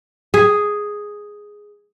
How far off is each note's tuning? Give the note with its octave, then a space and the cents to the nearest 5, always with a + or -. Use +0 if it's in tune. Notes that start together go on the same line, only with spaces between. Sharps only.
G#4 +0